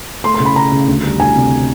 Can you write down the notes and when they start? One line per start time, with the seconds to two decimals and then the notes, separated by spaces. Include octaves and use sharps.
0.24 A3 C6
0.34 C6
0.40 C#3
0.45 B5
0.56 C#3 A#5
0.72 C#3
0.88 D2
1.03 G3
1.20 D2 G#5
1.36 C3